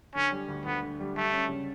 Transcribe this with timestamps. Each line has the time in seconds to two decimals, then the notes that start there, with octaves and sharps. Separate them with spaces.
0.15 D3 C#4
0.32 G3
0.48 D2
0.65 D2 B3
0.83 D3
1.00 G3
1.16 G3 A3
1.32 C#4
1.49 C#3